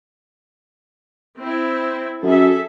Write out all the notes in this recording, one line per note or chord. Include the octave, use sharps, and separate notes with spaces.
C4 E4
F#2 G#4 A4 E5